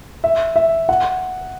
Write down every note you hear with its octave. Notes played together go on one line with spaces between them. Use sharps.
E5
E5
F#5